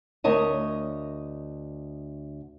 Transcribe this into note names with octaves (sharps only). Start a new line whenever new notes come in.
D2 A#4 C#5 D#5 A5